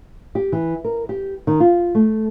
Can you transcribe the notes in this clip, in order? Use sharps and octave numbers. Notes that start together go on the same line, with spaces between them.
G4
E3
A#4
G4
D#3
F4
A3